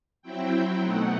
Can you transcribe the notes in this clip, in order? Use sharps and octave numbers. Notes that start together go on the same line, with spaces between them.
F#3 C4 E4 G5
B2 A3 D#4 F#5